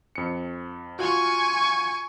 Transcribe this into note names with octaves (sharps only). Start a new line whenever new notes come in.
F2 C#7
F4 F#4 G#5 C#6